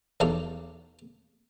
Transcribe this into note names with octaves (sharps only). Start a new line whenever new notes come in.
B1 E2 F#3 G4 A4 F5